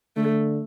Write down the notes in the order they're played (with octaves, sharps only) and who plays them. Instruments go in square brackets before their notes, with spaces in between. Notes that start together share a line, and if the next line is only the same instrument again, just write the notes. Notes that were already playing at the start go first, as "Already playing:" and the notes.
[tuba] D3 [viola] A3